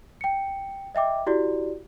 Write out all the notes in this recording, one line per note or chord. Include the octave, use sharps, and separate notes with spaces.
G5 C#7
D#5 E5 G5 D6
E4 F#4 G4 D5